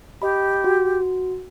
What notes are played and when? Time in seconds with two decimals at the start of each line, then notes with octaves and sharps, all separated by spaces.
0.22 G4 D#5 B5
0.64 F#4